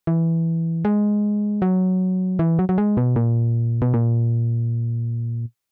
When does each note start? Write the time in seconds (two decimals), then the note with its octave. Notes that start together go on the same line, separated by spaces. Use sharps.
0.07 E3
0.85 G#3
1.62 F#3
2.39 E3
2.59 F#3
2.69 F#3
2.78 G#3
2.97 B2
3.16 A#2
3.82 B2
3.94 A#2